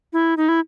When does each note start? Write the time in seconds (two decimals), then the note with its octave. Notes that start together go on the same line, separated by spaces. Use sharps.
0.13 E4
0.37 D#4
0.49 E4